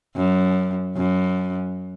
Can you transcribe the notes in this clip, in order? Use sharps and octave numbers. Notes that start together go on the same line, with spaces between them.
F#2
F#2